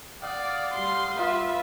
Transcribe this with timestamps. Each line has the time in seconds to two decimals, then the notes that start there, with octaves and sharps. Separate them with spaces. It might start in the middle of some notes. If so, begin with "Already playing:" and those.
0.23 D5 F5 F#5 D#6
0.74 G3 C6
1.19 F4 B4 E5